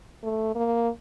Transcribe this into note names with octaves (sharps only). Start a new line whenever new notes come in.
A3
A#3